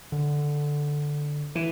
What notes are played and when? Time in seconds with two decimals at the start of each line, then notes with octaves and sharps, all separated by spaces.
0.12 D3
1.55 E3